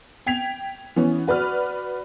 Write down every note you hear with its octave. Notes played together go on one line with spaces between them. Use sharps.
G5 G#6 B6 F7
E3 B3 C#4
F#4 B4 D5 F6